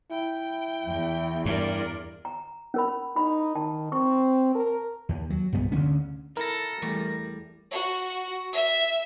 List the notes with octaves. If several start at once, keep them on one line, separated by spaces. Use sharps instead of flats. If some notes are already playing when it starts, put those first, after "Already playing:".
E4 G5
E2
G2 A#4 D5
A#5
C#4 A#4 B5
D#4 B5
D#3 A5
C4 C#6
A#4 A5
D#2
F#3
C2 G2 B3
D2 D3 B3 C#4
E4 A4 A#4 A#6
E2 G3 A3
F#4
E5